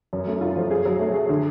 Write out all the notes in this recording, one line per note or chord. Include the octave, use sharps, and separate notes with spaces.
F#2
A3
F4
F3
G#4
F#3
A3
G#4
D3